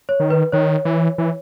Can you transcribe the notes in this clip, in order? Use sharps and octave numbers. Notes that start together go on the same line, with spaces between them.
C#5
D#3
B4
D#3 C#5
E3
E3